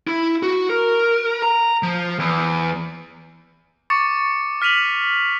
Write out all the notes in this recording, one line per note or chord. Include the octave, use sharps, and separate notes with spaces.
E4
F#4
A#4
A#5
F3
E2
C#6 D6 A6 C#7
F6 B6 D#7 F7 F#7